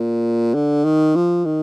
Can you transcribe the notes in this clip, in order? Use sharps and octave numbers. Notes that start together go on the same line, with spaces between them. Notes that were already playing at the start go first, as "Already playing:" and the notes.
Already playing: A#2
D3
D#3
F3
D#3